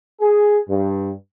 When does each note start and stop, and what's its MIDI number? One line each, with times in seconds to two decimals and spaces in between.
0.21 0.58 68
0.69 1.11 43